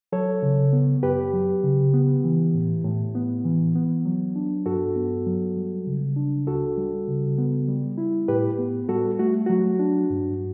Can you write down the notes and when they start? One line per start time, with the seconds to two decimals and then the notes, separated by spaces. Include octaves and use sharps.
0.12 F#3 A4 C#5
0.42 C#3
0.73 B3
1.03 F#2 G4 B4
1.33 F#3
1.64 C#3
1.94 B3
2.24 E3
2.54 A2
2.84 A2
3.15 B3
3.45 E3
3.75 B3
4.05 F#3
4.36 D4
4.66 G2 F#4 A4
4.96 B3
5.26 F#3
5.57 G3
5.87 C#3
6.16 D4
6.47 C#2 F#4 A4
6.77 G3
7.08 C#3
7.38 B3
7.68 G3
7.98 E4
8.28 A2 G4 B4
8.58 B3
8.88 G3 F#4 A4
9.19 A3 F#4
9.46 F#3 F#4
9.79 D4
10.10 G2